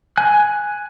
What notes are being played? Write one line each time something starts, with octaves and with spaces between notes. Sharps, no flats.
G#5 F#6